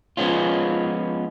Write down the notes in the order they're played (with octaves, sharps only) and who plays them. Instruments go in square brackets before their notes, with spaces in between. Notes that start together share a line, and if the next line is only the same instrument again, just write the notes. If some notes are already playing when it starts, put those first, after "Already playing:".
[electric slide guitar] F3 G#3 B3 C#4 F4